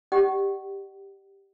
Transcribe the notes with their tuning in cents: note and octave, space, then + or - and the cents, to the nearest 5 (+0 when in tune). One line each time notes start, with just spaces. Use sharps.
G4 +0 D5 +40 F#5 +35